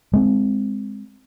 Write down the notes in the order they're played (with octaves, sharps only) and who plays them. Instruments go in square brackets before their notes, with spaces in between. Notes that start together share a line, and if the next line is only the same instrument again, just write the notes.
[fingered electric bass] G#3 C4